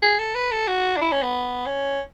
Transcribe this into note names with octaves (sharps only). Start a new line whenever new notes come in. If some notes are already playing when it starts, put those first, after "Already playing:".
G#4
A4
B4
A4
F#4
D4
E4
C#4
B3
C#4